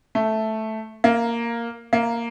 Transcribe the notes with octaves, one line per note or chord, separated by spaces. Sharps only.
A3
A#3
A#3